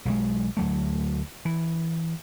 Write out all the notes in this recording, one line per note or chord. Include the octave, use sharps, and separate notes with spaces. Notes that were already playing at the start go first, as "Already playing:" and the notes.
B1 F#3 G#3
D2 F#3 A3
E3